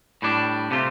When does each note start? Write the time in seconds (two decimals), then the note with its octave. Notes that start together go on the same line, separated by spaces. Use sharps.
0.22 A2 G3 D4
0.71 C3 A3 F4